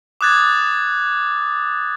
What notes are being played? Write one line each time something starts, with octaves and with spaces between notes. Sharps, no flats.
D6 D#6 F#6 G#6 A6